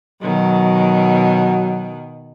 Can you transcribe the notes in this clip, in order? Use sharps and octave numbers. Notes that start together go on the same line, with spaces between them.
B2 D#3 F#3